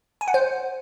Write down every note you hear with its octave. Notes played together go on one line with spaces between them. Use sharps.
G#5
F#5
C5